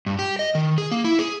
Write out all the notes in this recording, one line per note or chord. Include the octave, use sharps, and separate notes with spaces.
G2
G4
D#5
D#3
G#4
A#3
E4
G#4